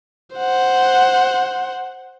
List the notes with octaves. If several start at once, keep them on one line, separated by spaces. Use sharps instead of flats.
C5 F#5